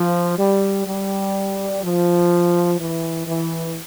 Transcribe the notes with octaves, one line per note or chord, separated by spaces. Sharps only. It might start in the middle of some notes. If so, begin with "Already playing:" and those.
Already playing: F3
G3
G3
F3
E3
E3